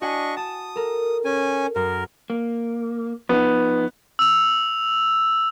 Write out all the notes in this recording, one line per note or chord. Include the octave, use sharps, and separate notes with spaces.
D4 F#4 D#5 F#5 G#5 C#6
A5 D#6 E7
A4 A#4
C#4 G#5
F#2 A#4
A#3
F3 B3 D#4
E6 F7